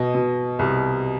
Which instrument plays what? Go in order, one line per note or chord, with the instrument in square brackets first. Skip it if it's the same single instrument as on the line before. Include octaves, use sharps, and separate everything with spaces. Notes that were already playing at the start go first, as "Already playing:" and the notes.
Already playing: [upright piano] B2 D#5
B2
C2